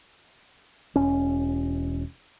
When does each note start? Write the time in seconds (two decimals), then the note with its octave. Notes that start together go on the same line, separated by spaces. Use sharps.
0.96 E1 C#4